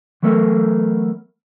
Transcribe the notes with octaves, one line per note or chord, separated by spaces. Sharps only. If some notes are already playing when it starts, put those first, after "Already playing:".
E3 F#3 A3 B3 A4 A#4